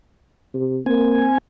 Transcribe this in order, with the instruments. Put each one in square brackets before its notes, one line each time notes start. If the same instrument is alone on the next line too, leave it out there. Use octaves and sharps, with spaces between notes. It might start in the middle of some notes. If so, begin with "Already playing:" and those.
[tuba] C3
[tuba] A#3 [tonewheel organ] C4 G#5